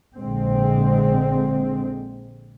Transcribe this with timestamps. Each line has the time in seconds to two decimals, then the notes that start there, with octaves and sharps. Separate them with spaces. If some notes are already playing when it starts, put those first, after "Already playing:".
0.17 A#1 D3 G#3 C4